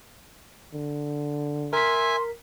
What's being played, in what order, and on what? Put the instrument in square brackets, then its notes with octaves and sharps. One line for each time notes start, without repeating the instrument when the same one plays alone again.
[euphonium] D3
[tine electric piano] A#4 B6 [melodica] E5 G#5 [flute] C6